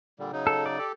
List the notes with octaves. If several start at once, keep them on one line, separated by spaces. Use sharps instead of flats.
A#2 D3 G3
C#3 F#3 D#4
A4
D5
G4 A4